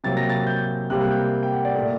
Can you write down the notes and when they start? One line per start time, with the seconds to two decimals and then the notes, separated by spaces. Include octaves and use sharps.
0.04 C3 F#3 A#3 A6
0.17 A#6
0.30 A6
0.47 G6
0.90 C3 G3 A#3 F#6
1.11 G5
1.43 G5
1.54 F#5
1.65 D5
1.75 A#2 A3 D5